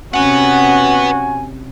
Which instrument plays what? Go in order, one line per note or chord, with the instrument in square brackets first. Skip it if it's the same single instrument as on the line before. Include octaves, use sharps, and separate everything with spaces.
[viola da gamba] C3 C#4 [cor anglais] F#4 [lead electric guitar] B4 F#5 [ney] G#5